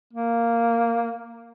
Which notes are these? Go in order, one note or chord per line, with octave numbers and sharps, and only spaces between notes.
A#3